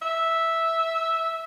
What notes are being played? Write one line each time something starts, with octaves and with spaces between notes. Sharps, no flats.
E5